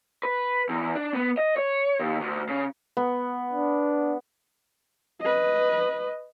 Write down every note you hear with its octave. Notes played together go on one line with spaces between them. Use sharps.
B4
E2
D4
B3
D#5
C#5
D#2
D2
C#3
B3
D4
B4 D#5